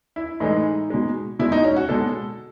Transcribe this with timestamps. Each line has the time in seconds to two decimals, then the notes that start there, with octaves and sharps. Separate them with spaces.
0.16 E4
0.40 A2 E3 G#3 D#4
0.90 B2 G#3
1.39 B2 G#3 E4
1.52 D#4
1.65 C#4
1.76 F#4
1.89 B2 G#3 A4